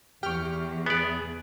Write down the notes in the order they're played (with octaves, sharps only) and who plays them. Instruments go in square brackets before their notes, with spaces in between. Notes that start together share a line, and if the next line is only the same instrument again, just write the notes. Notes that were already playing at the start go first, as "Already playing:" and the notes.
[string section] E2 [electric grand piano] G4 C#6 [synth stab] G5 F6
[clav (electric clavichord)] B3 D5 [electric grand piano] G#4